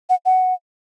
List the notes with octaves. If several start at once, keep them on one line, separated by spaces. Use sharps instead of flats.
F#5
F#5